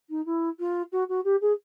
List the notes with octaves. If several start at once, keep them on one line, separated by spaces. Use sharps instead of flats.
D#4
E4
F4
F#4
F#4
G4
G#4